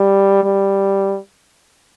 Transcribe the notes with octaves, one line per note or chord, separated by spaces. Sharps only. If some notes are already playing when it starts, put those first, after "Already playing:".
Already playing: G3
G3